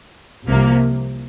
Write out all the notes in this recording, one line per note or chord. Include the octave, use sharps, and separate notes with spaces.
C2 C3 F3 A#3